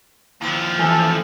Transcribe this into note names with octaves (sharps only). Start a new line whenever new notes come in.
D#2 F3 E4 D6 E6
E3 A3 A4 G#5